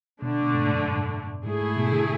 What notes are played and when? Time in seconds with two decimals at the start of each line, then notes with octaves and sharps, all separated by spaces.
0.22 B2 D3 A3 D4
0.42 B2
0.55 G#2
0.63 A2
0.73 F#2
0.84 G#2
1.46 G#2 A3 E4 G#4
1.61 G#2
1.77 B2
1.92 D3